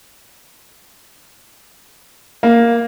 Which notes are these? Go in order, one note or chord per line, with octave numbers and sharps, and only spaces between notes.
A#3